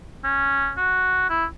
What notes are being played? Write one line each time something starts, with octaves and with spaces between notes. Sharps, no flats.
C#4
F#4
E4